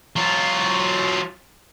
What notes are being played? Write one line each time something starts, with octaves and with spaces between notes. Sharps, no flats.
F#3 F4